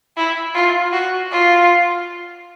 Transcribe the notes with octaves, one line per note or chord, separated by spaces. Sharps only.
E4
F4
F#4
F4